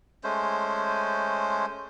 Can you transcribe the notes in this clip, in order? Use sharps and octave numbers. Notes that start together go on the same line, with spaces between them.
G#3 A3 C#4 C5